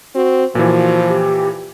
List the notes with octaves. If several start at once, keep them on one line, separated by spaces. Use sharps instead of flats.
C4 F#4
A#2 E3 F3 F#4
G4